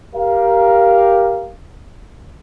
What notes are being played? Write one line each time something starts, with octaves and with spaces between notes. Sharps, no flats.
G4 A#4 F5